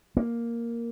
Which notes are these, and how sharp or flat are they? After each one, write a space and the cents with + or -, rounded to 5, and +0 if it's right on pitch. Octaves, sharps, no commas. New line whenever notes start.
A#3 +0